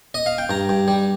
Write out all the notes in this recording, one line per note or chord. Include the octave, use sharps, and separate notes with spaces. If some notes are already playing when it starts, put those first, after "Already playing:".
D#5
F5
G5
G2 A#5
G2
G3